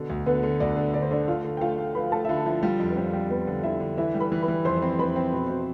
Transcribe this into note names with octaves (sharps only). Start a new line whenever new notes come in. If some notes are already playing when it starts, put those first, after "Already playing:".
Already playing: B2 D3
D2
D3 B3 B4
D3
D2 D4 D5
D3
D3 D5
C5
D3 D4 D5
A3 F4 F5
D3
G5
A3 F4 F5
A3
F3 B4 B5
A3 A4 A5
E5
D3 F4 F5
F3 E4 E5
G3 F4 F5
F2
B4
G3 C4 C5
G3
F2 B3 B4
D3
D3 E4 E5
D3
E3 E4 E5
G3
B4 B5
E3
B4 B5
E3
F2 C5 C6
C4
F2 B4 B5
C4
B2
B2